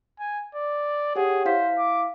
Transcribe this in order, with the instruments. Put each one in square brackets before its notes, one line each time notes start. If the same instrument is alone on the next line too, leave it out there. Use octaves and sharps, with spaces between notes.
[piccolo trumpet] G#5
D5
[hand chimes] G4 C#5 F#5 [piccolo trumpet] G#4
[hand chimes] E4 F5 B6 [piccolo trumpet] C5
[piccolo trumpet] D6